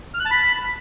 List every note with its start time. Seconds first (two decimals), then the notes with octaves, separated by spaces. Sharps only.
0.14 F6
0.20 F#6
0.25 A5
0.31 B5